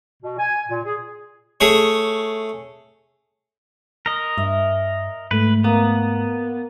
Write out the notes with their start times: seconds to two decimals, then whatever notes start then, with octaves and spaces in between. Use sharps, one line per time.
0.22 B2
0.38 G#5
0.69 A#2
0.84 G#4
1.61 A3 G#4 C#5
4.06 A#4 D#5
4.37 G2 E5
5.31 G#2 A3 B4
5.64 A#3 B3